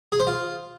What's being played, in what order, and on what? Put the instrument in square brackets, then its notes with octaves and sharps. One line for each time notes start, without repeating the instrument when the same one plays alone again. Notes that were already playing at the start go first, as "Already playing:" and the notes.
[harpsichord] G#4
C5
F4